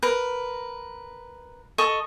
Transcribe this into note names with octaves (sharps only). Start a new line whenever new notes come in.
A#4 B4
A4 D#5 C#6